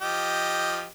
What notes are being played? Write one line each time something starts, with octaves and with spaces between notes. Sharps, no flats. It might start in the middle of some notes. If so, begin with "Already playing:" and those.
F3 G4 D#5